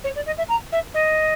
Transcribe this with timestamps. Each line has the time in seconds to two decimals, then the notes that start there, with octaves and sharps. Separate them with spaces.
0.04 C#5
0.16 D5
0.26 D#5
0.38 E5
0.49 A#5
0.72 E5
0.94 D#5